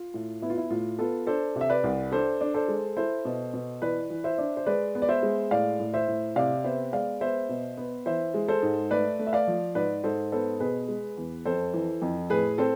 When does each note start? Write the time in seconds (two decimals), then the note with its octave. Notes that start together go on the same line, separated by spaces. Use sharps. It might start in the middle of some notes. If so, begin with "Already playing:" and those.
Already playing: F4
0.14 A2
0.42 B3 E4
0.50 F4
0.57 E4
0.70 A2 F4
0.99 B3 F4 A4
1.27 D4 A4 C5
1.55 C3
1.61 E5
1.70 B4 D5
1.84 C2
2.12 D4 A4 C5
2.41 D4
2.54 A4 C5
2.68 G#3
2.97 E4 A4 C5
3.25 B2
3.54 B2
3.82 E3 B4 D5
4.10 E3
4.24 C5 E5
4.38 D4
4.57 C5
4.66 G#3 B4 D5
4.95 B3
5.02 D5
5.09 C5 E5
5.23 G#3
5.51 A2 D5 F5
5.80 A2
5.94 C5 E5
6.08 A2
6.36 C3 D5 F5
6.64 B3 C5 E5
6.93 G#3 D5 F5
7.21 B3 C5 E5
7.49 B2
7.77 B3
8.06 E3 C5 E5
8.34 G#3
8.48 A4 C5
8.63 G#2
8.91 A3 B4 D5
9.19 A3
9.27 E5
9.33 D5 F5
9.48 F3
9.75 G#2 B4 D5
10.04 G#2 A4 C5
10.32 B3 A4 C5
10.60 B2 G#4 B4
10.88 G#3
11.17 E2
11.45 F2 A4 C5
11.74 E3
12.02 F2
12.30 A2 G#4 B4
12.58 C4 A4 C5